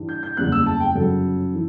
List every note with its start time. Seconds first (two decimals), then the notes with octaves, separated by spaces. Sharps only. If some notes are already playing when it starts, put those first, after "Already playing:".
Already playing: G2 E3 G3
0.09 G6
0.23 G6
0.37 F#1 E2 C#3 G3 B3 F#6
0.52 E6
0.66 A5
0.80 G5
0.95 G1 F#2 C#3 F#3 A4
1.54 E3